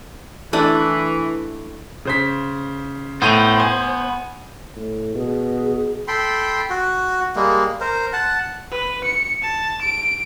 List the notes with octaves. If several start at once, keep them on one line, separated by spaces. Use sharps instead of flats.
E3 A3 D4 E4
C#3 C5 B6
A2 B3 C5 D#7 F7
G#5
A2
B2 G#4
A4 G5 B5 C6
F#4
G3 G#3 A#3
A#4 C5
F#5 A5
B4
C#7
A5
D7